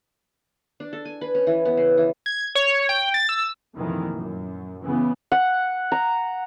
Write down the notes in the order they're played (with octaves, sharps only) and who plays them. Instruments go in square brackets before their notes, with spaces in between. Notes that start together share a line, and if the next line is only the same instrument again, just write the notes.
[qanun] D4
A4
G#5
B4
C#4
E3
B3
C#3
E3
[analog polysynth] G#6
C#5
G5
A6
E6
[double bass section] F1 F2 A#2 D#3 E3
F#2
C#3 E3 B3
[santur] F#5
A#5